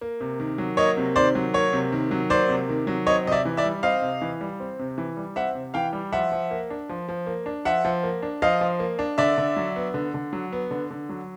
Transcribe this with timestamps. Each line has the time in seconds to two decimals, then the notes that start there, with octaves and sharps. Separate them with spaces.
0.01 A#3
0.20 C3
0.40 D#3
0.58 F#3
0.77 A#3 C#5 D#5
0.97 C3
1.16 D#3 C5 D5
1.35 F#3
1.54 A#3 C#5
1.73 C3
1.92 D#3
2.11 F#3
2.30 A#3 C5 D5
2.49 C3
2.69 D#3
2.87 F#3
3.07 C4 C#5 D#5
3.25 C3 D#5
3.32 D5 E5
3.45 E3
3.57 D5 E5
3.64 G3
3.83 C4 D#5 F5
4.02 C3
4.22 E3
4.41 G3
4.60 C4
4.79 C3
4.98 E3
5.17 G3
5.36 C4 E5 F#5
5.55 C3
5.74 E3 F5 G5
5.93 G3
6.12 F3 E5 F#5
6.32 F3
6.51 A#3
6.70 D4
6.89 F3
7.09 F3
7.26 A#3
7.46 D4
7.65 F3 E5 F#5
7.85 F3
8.03 A#3
8.22 D4
8.42 F3 D#5 F5
8.61 F3
8.80 A#3
8.99 D4
9.18 D3 D5 E5
9.38 D3
9.56 F#3
9.76 B3
9.94 D3
10.14 D3
10.33 F#3
10.52 B3
10.71 D3
10.91 D3
11.09 F#3